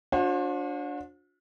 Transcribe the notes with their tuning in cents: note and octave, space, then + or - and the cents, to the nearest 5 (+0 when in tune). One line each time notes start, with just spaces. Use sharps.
D4 -10 F#4 -45 C5 +35